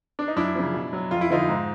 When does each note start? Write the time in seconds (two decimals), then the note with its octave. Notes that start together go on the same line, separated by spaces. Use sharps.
0.19 D4
0.28 D#4
0.36 F#2 D4 E4
0.55 C#3 F3
0.74 B2
0.93 F#3
1.11 F2 F4
1.21 E4
1.30 D3 F3 D#4 F4
1.49 G#2